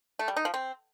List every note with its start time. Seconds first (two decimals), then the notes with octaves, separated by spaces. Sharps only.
0.19 A3
0.28 G3
0.37 D#4
0.45 F3
0.54 C4